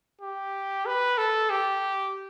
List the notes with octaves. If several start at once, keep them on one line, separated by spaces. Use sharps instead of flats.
G4
B4
A4
G4